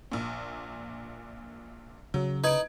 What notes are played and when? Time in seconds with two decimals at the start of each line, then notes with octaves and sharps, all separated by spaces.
0.12 A#1 A#2
2.14 C#3 F#3
2.44 D#4 B4 G#6 D7